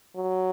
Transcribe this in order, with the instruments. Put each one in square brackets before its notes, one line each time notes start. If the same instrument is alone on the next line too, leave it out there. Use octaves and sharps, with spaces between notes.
[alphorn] F#3